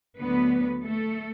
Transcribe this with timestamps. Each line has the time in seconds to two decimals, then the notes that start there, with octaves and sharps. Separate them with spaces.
0.17 D2 D3 F#3 B3 B4
0.84 A3 A4